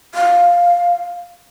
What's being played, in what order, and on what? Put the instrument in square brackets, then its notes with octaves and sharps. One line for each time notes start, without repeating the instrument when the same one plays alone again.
[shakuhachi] F5